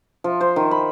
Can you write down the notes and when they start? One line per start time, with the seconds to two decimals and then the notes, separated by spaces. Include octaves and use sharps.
0.24 F3
0.41 C5
0.56 D#3
0.71 B5